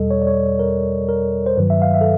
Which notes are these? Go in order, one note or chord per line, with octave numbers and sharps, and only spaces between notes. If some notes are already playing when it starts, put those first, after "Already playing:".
Already playing: E2 B2 G3 A4 D#5
C#5
D5
C#5
A#4
A#4
C5
G2 D#3 F#3 B4
E5
F5
E5
A4